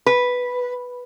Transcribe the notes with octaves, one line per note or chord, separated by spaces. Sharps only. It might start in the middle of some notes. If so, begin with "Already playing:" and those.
B4